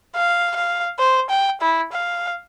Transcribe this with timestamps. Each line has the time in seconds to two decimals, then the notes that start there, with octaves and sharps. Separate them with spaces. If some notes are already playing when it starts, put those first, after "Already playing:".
0.16 F5
0.56 F5
0.99 C5
1.30 G5
1.61 E4
1.93 F5